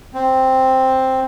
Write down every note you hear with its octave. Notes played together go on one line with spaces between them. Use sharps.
C4